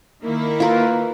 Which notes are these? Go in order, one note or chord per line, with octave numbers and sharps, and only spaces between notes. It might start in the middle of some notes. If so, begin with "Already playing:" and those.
D#3 A#3 E4
F4 A#4 B4